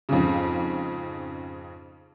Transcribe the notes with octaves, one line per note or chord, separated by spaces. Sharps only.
F2 G#2 C#3